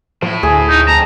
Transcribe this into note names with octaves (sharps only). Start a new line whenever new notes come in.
A2 F3 E4
D2 G#4
D#4
F2 A5 A#5